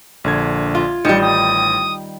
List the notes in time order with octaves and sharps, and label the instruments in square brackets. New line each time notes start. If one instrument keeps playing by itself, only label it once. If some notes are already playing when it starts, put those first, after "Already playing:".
[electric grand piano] A#1 D3 G#6
[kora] F4
[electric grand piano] A1 [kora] D#3 G3 [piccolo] C#7
[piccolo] D#6